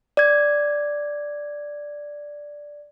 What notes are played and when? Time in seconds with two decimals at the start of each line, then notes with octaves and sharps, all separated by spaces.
0.17 D5 G#6